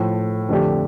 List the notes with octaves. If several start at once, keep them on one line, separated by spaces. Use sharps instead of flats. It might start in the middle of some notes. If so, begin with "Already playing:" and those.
Already playing: A2 F3 A3
F2 D3 A3 D4 G4